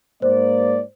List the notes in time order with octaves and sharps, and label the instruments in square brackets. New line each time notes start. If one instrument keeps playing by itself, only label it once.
[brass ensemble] G#2 A#3 D5 [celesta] C5